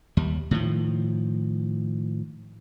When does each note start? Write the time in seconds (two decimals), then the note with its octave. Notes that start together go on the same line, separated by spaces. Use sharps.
0.17 D#2 G3
0.51 A2 D#3 F3